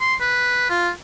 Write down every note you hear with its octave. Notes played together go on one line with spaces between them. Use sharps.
C6
B4
F4